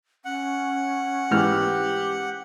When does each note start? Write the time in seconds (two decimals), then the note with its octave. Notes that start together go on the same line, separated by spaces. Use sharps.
0.25 C#4 F#5
1.31 G#2 E3 G4 F6